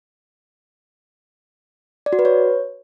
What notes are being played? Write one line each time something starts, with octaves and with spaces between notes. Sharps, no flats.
D5
F#4
B4
C#5